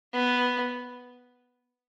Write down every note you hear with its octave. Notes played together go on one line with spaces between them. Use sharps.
B3